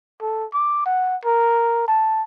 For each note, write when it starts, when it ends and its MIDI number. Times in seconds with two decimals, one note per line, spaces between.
0.21 0.46 69
0.54 0.85 86
0.86 1.16 78
1.26 1.86 70
1.88 2.22 81